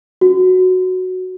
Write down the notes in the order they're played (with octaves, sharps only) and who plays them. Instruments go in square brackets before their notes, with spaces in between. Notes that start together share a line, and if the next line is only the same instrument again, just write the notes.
[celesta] F#4